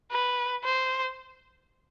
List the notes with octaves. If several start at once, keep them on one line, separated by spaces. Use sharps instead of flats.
B4
C5